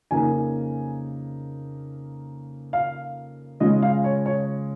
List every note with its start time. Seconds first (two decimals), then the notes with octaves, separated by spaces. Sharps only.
0.11 F2 C#3 A#3 D#4 G#5
2.73 F5
3.60 C#3 G#3 C#4 F4 D#5
3.82 F5
4.04 C#5
4.26 C#5